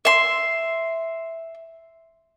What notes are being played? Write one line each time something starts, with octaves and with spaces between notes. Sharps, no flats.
E5 C6